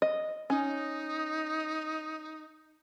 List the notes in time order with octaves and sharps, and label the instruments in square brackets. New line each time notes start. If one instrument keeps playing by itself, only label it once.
[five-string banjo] D#5
[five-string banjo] C#4 [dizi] D#4